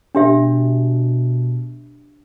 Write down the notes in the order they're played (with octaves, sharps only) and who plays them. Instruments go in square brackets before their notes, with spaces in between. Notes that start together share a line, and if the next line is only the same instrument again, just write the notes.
[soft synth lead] B2 [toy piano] D4 G4 E5